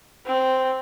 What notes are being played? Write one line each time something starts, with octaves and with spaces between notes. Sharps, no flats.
C4